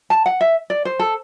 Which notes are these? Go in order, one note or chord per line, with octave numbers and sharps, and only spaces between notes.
A5
F#5
E5
D5
C5
A4